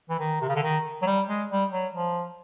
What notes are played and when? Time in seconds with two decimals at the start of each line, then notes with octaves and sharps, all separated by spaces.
0.10 E3
0.20 D#3
0.42 C3
0.49 C#3
0.56 D3
0.63 D#3
1.02 F#3
1.07 G3
1.28 G#3
1.50 G3
1.72 F#3
1.94 F3